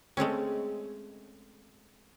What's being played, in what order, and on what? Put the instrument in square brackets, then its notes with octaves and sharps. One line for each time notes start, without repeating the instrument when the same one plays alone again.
[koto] G#3 A3 C4 C#4